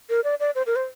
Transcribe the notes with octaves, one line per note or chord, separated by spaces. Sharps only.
A#4
D5
D5
C5
A#4
C5